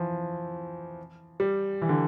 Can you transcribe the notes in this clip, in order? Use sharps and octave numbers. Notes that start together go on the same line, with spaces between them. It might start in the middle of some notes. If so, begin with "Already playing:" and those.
Already playing: E3 F3
G3
E3
D3